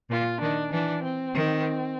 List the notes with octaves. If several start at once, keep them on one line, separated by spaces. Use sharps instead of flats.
A#2 F4
D#3 D4
E3 D4
C4
D#3